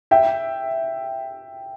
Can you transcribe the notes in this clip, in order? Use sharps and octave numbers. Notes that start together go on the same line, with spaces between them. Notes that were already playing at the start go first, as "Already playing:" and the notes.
E5 G5